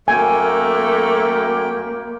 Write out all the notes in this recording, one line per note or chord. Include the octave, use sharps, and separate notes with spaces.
F#2 A3 A#3 G5 G#5